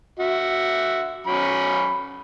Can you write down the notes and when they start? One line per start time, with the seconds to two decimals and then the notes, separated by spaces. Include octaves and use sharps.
0.19 F#4 E5
1.27 F#3 C#4 B5